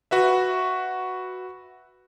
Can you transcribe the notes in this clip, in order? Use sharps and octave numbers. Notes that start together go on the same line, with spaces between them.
F#4 B4 E5